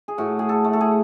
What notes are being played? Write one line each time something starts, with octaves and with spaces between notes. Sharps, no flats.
G#4
A2 F#4
G#4
A4
A3
A4
G#4